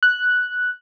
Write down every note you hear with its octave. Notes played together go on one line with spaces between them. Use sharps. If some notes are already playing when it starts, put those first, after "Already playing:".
F#6